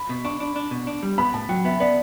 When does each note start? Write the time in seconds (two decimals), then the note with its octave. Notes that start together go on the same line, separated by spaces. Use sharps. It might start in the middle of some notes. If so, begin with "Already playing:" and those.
Already playing: B5
0.09 B2
0.25 D4 C#6
0.40 D4
0.56 D4
0.71 B2
0.87 D4
1.03 G3
1.18 B3 B5
1.34 A2 A5
1.49 F#3 G5
1.65 B3 E5
1.80 B3 D5